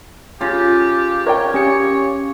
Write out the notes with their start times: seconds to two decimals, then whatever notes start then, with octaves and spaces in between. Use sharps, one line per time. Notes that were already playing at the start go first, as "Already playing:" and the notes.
0.41 C#3 F4 G4
1.26 A#4 C#5 D5 G5
1.54 C#4 G4 C#7